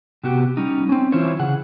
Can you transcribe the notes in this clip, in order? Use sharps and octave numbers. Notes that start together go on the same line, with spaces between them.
C3 B3 F#4 G4
G3 C#4 D#4
C4 C#4
E3 E4 F4 C5 C#5
C#3 G#4 F#5